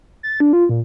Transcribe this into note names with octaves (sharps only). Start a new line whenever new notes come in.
A6
D4
F4
A#2